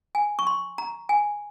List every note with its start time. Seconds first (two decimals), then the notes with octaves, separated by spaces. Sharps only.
0.15 G#5
0.39 C#6
0.47 C6
0.78 A#5
1.09 G#5